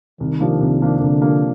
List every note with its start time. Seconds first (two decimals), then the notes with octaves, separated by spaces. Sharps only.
0.20 C2 D#3
0.40 C3 F3 A#3 D4
0.60 C2
0.81 C3 F3 A#3 D4
1.01 C2 D3
1.21 C3 F3 A#3 D4